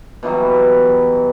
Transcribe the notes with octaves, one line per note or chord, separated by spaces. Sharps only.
B2 E3 F#3 G3